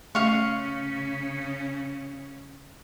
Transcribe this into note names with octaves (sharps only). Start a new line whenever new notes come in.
C#3 A3 C#4 F5 C#6